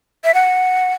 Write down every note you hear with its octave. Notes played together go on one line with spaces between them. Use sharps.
E5
F#5